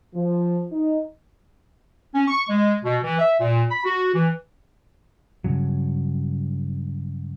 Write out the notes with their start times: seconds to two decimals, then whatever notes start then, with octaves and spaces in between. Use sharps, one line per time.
0.15 F3
0.72 D#4
2.14 C#4
2.28 C#6
2.48 G#3
2.83 B2
3.03 E3
3.19 E5
3.40 A#2
3.70 B5
3.84 F#4
4.14 E3
5.44 G2 C#3 F#3